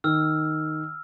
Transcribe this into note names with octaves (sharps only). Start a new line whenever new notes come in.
D#3 E6 F6